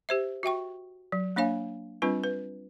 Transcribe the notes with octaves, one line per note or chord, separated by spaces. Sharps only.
G4 C5 E5
F#4 E5 G5 C#6
F#3
A#3 D4 C#5 F5 G#5
G3 C4 D4 F4 B4
B4